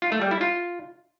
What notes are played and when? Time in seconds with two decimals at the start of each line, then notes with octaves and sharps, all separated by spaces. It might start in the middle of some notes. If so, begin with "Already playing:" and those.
0.02 F4
0.12 A3
0.21 G3
0.31 E4
0.41 F4